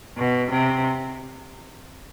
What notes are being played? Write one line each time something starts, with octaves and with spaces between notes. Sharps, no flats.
B2
C3